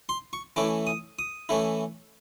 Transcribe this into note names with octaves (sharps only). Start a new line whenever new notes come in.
C6
C#6
E3 A3 C#4 E4 D6
D#6
D#6
E3 A3 C#4 E4